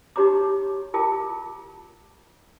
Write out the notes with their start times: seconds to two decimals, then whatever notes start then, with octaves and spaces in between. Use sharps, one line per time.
0.16 D#4 F#4 G4 C#5 A#5 D6
0.94 E4 F4 A#4 G5 A5 D6